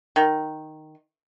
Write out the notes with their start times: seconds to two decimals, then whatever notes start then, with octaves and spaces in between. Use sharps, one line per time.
0.16 D#3